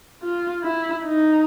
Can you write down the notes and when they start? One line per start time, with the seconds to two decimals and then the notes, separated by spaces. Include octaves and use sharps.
0.23 F4
0.64 E4
1.05 D#4